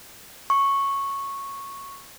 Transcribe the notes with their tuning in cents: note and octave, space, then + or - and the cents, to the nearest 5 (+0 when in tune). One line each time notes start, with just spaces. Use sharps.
C#6 -5